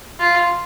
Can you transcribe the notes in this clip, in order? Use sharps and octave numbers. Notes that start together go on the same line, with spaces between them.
F4